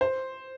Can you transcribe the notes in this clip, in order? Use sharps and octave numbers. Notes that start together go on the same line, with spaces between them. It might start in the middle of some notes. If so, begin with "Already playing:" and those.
C5